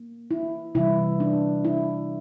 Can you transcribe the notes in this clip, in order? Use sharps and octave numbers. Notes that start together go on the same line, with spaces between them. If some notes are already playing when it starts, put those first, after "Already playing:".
Already playing: A#3
E4
C3 E3 G3 E4
D4
E4